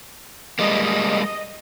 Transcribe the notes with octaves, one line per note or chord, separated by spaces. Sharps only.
G3 G#3 A#3 D#5